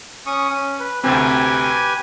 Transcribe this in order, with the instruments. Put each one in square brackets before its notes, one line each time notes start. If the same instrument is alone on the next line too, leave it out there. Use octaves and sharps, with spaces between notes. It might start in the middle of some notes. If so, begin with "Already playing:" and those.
[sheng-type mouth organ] C#4 C#6 D#6
C#4
B4
[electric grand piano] D2 C3 C4 [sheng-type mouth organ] G4 B4 G#5